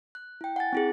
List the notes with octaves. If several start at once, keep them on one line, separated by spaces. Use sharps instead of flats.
F#6
E4 G5
F#5 G#5 A6
C4 E4 G#4